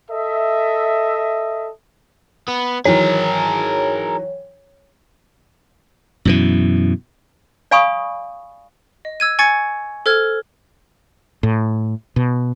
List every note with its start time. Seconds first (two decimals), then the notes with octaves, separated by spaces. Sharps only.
0.11 A4 D#5 E5
2.48 B3
2.85 D#3 E3 F#3 G#4 A#4 C#5
6.25 F#2 B2 E3
7.71 D5 F5 G#5 B5 C#6 D#6
9.05 D#5
9.20 E6 G#6 D#7
9.39 G#5 C#6 G#6 A6 C#7
10.06 A4 C5 F6 G#6
11.43 A2
12.16 B2